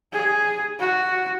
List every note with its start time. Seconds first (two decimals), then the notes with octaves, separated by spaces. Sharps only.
0.13 G#4
0.80 F#4